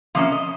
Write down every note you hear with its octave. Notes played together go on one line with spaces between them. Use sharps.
C3 F3 A#3 C#4 F5
D#5